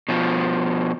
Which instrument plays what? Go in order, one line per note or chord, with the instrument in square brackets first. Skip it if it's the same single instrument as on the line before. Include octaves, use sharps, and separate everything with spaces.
[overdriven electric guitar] B2 F3